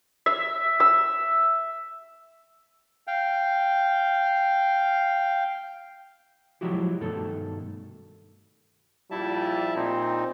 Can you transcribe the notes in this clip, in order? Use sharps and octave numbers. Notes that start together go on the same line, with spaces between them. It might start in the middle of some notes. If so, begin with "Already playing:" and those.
E5
E6
F5 G5
F3 F#3 G#3 E4 F#4 G4
G2 B2 D#3 A3 A4
A#1 F3 G3 E4 E5 A5
A#2 C4 D#4